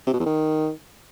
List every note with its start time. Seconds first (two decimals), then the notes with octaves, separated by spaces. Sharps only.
0.07 C3
0.13 B2
0.20 E2
0.26 D#3